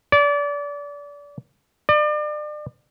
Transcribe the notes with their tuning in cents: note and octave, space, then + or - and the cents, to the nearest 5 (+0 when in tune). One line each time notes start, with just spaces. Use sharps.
D5 -30
D5 +35